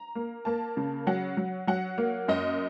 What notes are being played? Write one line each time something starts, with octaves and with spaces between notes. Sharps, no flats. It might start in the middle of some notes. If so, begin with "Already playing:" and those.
Already playing: A#5
A#3
A#3 A5
C#3
F#3 F#5
F#3
F#3 F#5
A#3
F#2 D#5